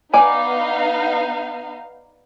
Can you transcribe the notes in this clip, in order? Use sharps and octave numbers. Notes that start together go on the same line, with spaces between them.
B3 D#4 D5 F5 G#5